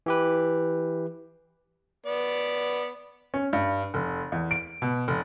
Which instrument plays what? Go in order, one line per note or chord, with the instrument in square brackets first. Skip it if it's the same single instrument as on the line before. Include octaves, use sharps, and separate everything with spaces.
[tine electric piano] E3 G4 B4
[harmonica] B3 D5
[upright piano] C#4
G2
F1
E2
D7
B2
F1